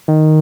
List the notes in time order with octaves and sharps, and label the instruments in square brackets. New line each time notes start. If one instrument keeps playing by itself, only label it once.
[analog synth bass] D#3